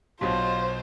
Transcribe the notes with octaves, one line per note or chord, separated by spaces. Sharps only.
B1 B2 F4 C5